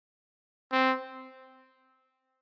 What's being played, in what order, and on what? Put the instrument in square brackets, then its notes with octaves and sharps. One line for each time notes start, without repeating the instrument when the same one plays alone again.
[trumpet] C4